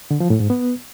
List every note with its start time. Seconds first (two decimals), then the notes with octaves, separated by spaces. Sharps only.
0.11 D3
0.20 F3
0.30 A2
0.40 G#2
0.50 B3